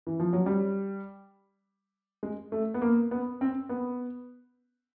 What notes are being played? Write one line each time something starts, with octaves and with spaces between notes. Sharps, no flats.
E3
F3
F#3
G3
G#3
A3
B3
A#3
B3
C4
B3